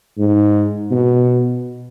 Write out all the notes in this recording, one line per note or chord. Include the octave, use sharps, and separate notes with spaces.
G#2
B2